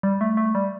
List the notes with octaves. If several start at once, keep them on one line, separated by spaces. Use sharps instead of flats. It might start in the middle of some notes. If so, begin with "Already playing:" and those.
G3
A3
A3
G3